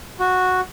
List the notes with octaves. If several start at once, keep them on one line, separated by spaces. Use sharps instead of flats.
F#4